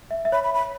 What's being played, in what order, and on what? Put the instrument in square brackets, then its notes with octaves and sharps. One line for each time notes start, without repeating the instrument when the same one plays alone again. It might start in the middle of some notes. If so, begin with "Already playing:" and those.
[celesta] E5
E5
[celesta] C#5 [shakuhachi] B5
[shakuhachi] B5
B5